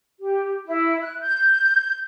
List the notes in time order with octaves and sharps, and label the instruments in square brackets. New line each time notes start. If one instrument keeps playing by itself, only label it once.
[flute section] G4
E4
F#6
G6